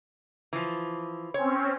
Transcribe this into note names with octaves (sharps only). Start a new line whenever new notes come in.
E3 F3
C4 C#4 C#5